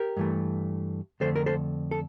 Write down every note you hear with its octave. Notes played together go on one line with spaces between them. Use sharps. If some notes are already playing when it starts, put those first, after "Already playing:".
Already playing: G4 A#4
G2 E3 A3
F2 D3 A3 A4 C5
A#4
A4 C5
A4